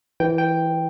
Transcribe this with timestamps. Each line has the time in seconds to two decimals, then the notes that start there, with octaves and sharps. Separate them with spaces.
0.20 E3 G5
0.38 G5